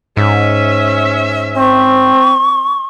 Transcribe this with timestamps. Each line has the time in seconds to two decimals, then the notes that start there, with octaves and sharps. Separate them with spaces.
0.17 G#2 C#4 E5
1.56 C4 C#6